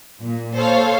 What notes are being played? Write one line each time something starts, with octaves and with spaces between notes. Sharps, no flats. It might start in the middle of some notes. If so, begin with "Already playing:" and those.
A#2
A4 C5 C#5 F5